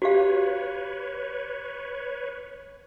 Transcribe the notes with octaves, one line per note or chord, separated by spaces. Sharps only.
F#4 G4 B4 C#5 F5